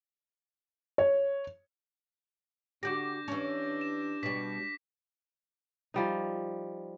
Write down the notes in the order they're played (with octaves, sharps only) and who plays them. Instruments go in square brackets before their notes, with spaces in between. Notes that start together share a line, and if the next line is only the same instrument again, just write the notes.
[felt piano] C#5
[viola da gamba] D3 [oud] F#4 G4 [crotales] D6 G6 A#6
[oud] E3 C#4 [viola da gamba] D4 G4
[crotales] E7
[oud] B2 G3 [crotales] B6
[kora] F3 G3 D#4